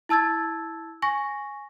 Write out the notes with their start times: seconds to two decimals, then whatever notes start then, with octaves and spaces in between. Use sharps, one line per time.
0.09 E4 A5 E6 G#6 A6
1.02 G#5 C#6 A#6